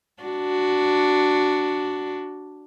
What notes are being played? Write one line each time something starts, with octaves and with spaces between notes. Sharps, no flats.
D4 F#4